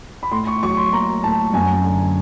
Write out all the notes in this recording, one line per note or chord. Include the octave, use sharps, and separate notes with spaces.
B5
A2 C6
C#6
F#3 C#6
C6
A#3 A#5
A2 A5
F#2 G#5
D3